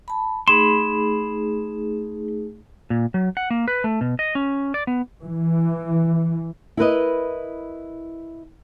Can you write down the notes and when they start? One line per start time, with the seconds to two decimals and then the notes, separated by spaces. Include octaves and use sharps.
0.08 A5 B5
0.48 A3 D#4 G#4 B5 C6 E7
2.90 A#2
3.14 F#3
3.37 F#5
3.51 A#3
3.68 B4
3.84 A3
4.01 B2
4.19 D#5
4.35 C#4
4.74 D5
4.87 B3
5.22 E3
6.77 E4 A#4 B4 D#5